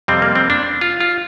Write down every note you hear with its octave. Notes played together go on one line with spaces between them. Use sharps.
F2 C3 G3 C4
A#3
C4
D4
F4
F4